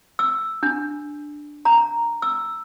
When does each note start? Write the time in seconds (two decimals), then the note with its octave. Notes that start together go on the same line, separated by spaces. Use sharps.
0.19 E6
0.63 D4
1.65 A#5
2.22 E6